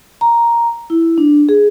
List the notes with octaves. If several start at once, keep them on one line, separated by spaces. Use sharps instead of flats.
A#5
E4
D4
G#4